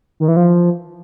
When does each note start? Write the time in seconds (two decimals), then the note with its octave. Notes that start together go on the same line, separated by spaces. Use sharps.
0.20 D#3
0.28 E3
0.36 F3